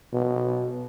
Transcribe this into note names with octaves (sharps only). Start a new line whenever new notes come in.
B2